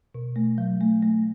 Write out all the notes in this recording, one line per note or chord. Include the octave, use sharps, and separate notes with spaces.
B2
A3
F#3
A3
A3